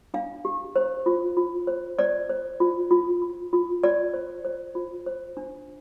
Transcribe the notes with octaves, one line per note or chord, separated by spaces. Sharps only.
D4 F5
G4
C5
F4
F4
C5
C5 D5
C5
F4
F4
F4
F4
F4 D5
C5
C5
F4
C5
D4